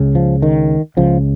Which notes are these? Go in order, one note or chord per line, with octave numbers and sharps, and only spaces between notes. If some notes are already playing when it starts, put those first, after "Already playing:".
Already playing: C#2 C#3
F3
D#3
C#2 C#3 F3